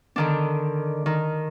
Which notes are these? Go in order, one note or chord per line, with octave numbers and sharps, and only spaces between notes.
D3 D#3 D4
D#3